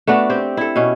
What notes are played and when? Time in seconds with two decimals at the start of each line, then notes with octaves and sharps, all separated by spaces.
0.07 A3 B3 D4 F#4
0.30 C4 G4
0.57 E4 A4
0.76 B2 C#4